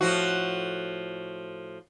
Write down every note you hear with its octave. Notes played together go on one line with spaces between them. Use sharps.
A2 F3 F#4